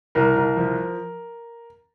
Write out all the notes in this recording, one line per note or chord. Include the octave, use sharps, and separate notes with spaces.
C2 A#4
C2
F3